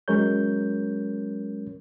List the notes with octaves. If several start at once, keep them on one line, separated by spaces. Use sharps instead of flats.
F#3 G#3 C#4 A#4 C#5 G6